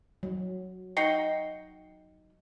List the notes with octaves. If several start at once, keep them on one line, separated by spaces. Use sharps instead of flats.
F#3
D#4 F#4 D#5 G5 C7 C#7